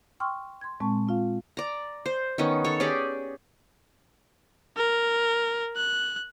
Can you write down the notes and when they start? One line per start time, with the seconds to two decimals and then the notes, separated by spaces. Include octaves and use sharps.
0.20 G5 C6 C#6 E6 F6
0.61 C6 G#6
0.80 A#2 G#3 C4 A5 C#6
1.07 C4 F4 F5
1.57 D5 A#5
2.06 C5
2.38 D#3 B3 C#4
2.64 A4 C#5
2.80 C#4 G4 G#4 D5
4.77 A#4
5.77 F#6